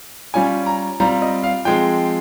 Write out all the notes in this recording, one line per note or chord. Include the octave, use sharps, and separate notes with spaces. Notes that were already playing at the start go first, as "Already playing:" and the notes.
G3 C#4 F4 G#5
A#5
G3 C4 F4 A#5
D#5
F5
F3 G#3 C4 G5